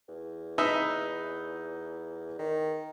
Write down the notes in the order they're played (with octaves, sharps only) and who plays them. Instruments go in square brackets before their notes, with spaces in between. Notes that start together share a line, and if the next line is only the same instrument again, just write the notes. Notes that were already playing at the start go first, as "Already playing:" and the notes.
[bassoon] E2
[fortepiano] D#4 B4 E5
[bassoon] D#3